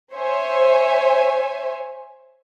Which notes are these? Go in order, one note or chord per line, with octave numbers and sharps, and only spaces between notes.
C5 C#5 E5 G#5